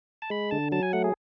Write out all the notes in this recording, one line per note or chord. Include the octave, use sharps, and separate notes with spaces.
A5
G#3 B5
D3 A5
F#3 A5
G#5
A3 F#5
G#4